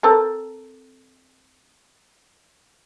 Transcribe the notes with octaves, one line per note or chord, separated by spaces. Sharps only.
C4 A4 A#4